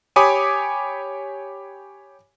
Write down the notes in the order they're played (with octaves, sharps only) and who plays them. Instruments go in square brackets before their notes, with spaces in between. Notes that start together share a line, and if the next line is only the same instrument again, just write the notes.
[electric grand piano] G4 C#5 G#5 B5 D6 D#6